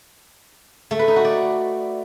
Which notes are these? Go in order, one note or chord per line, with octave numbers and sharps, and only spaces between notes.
A3
B4
D#4
F#4
D5